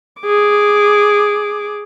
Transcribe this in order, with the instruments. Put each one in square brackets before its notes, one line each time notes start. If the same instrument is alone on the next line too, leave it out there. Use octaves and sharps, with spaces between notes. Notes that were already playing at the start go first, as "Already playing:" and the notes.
[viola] G#4 D6